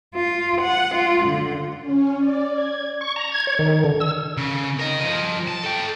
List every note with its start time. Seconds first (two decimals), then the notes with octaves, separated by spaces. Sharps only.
0.15 F4
0.62 F#5
0.95 F4
1.26 D3
1.81 C#4
2.18 D5
2.53 G#6
3.01 C#6
3.16 A#5
3.32 G#6
3.47 C#5
3.59 D#3
3.84 D3
4.00 E6
4.37 C#3
4.80 A#4 D#5
5.01 F3 D#5
5.48 A5
5.64 A4 G5